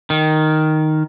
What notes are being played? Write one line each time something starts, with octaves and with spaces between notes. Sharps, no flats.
D#3